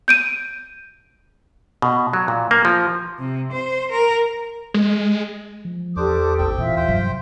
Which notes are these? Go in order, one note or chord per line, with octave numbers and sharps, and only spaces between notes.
G6 D7 D#7
B2
F#3
A#2
A#3
F3
C3
C5
A#4
G#3
F3
E2 D4 G4 A4 C5 D6 D#6
A1 D#2 C4 G5
A#2 E3 F4 E5
D#2 C5 G5
G2 C3 F#3